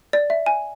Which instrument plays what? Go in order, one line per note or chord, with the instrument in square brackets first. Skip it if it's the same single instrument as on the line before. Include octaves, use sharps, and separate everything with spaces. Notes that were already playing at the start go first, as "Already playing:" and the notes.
[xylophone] D5
E5
G#5